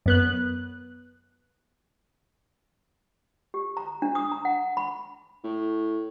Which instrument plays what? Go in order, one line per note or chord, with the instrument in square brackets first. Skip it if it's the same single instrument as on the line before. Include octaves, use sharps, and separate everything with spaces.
[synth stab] F#2 B3 F#6
[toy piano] G4
A#5
D4
D#6
A#5
F#5
B5
[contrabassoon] A2